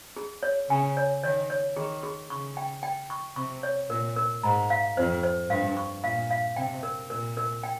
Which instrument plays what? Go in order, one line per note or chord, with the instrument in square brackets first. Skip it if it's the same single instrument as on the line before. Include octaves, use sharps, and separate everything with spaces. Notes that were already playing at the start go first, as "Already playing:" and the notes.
[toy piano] G#4
C#5
[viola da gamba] C#3 [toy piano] G#5
[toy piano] C#5
[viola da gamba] D#3 [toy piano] C#5
[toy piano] C#5
[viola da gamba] D#3 [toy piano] G#4
[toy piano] G#4
[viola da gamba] C#3 [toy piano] C#6
[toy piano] G5
G5
C#6
[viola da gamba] C3 [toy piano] C#6
[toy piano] C#5
[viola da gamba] A#2 [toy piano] A#4
[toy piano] A#4
[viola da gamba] G#2 [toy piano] A#5
[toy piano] F5
[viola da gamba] F2 [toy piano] C5
[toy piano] C5
[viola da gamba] G2 [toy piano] F5
[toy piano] C#6
[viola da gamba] A#2 [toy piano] F5
[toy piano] F5
[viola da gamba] C3 [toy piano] G5
[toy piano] A#4
[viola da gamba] A#2 [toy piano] A#4
[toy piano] A#4
G5